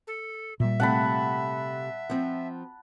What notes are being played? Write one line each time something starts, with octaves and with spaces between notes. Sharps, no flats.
A4
A#2 G3 E5
C3 A3 F#5 A5 B5
F3 C4